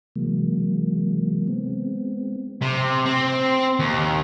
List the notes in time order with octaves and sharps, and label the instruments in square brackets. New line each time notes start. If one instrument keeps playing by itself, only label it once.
[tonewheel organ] C3 E3 F#3 G#3 A#3
G#3 B3 C4
[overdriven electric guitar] C3
C4
D#2